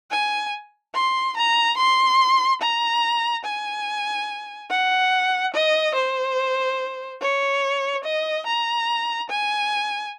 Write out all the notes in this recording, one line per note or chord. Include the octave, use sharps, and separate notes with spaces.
G#5
C6
A#5
C6
A#5
G#5
F#5
D#5
C5
C#5
D#5
A#5
G#5